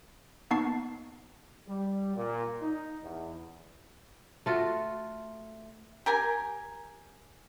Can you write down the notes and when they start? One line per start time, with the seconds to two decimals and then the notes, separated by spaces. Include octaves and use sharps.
0.51 A#3 B3 D#4 A5 C#6 C7
1.67 G3
2.15 A#2
2.61 D#4
3.02 E2
4.46 A3 F4 F#4
6.06 G4 A#4 G#5